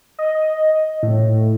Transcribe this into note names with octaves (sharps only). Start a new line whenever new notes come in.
D#5
A2